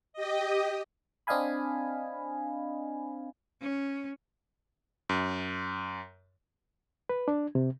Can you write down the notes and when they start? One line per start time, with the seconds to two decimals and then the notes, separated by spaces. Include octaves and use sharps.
0.13 G4 D#5
1.27 C4 D4 D#5 F5 G#5 B5
3.61 C#4
5.09 F#2
7.09 B4
7.28 D4
7.55 C3